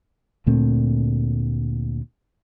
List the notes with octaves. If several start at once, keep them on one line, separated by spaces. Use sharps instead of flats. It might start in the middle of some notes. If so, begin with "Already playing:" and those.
D2 A#2 A3 C4